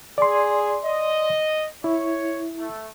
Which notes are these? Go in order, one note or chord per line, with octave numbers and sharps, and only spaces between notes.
G#4 D5 C6
D#5
E4 C#5
A3